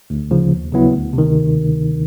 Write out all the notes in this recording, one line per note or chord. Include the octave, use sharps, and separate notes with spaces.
D2
C#3 F3
D#2
C#3 F#3 B3 E4
D2
C3
D#3